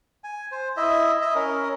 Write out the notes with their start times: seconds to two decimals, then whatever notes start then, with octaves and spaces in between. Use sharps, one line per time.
0.24 G#5
0.52 C5
0.77 E4 D#5 E5
1.22 D#5 E5
1.35 C#4 A#4